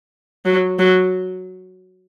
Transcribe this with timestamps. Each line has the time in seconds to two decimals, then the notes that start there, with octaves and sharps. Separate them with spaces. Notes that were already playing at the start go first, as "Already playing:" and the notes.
0.45 F#3
0.79 F#3